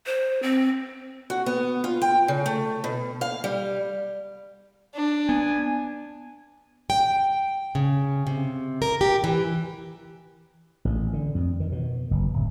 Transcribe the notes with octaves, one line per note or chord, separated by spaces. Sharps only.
C5
C4
F#4
B3
F4
G5
C#3
A3
B2
F5
G3
D4
B3 G#5
G5
C#3
C3
A#4
G4
E3
A1
D3
F2
D#3
B2
F#1
D1